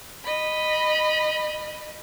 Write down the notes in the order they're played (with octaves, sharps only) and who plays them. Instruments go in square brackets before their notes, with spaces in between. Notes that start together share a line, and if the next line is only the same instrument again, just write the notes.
[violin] D#5 B5